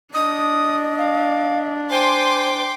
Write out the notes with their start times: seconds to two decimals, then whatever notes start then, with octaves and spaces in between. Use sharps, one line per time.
0.14 D4 D#5 D#6
0.98 F5
1.91 C5 G5 G#5 C6 D6